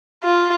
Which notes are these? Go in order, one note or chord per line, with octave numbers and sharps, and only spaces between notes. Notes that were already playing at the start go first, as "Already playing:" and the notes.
F4